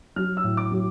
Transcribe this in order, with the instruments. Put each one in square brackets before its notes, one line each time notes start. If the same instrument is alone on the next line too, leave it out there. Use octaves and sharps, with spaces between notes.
[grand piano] F#3 F6
E6
A2
D6
F#3